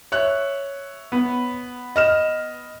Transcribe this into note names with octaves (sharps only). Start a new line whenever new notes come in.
C#5 E5 F#6
B3
D#5 F6 E7